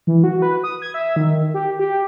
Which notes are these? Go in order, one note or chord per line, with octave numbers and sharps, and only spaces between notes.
E3
F#4
B4
D#6
G#6
E5
D#3
G4
G4